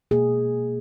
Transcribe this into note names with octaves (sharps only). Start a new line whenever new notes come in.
B2 A#3 G#4